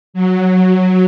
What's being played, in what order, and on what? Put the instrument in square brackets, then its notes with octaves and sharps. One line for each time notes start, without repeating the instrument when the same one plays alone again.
[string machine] F#3